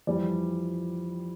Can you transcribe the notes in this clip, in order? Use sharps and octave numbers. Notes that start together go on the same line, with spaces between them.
F2 E3 G3 D5